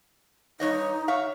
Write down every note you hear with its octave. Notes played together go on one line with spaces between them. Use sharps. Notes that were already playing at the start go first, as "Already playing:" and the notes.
G2 D#4 C#5 D#5
C#5 E5 F5